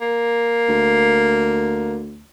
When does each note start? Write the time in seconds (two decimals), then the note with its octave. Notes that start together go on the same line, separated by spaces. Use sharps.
0.01 A#3
0.69 D2